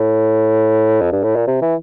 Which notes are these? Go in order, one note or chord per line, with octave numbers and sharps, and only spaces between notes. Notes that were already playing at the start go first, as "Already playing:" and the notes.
Already playing: A2
F2
G2
A2
A#2
C3
E3